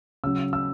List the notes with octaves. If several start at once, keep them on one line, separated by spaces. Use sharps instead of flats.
C#3 F#3 E6
E6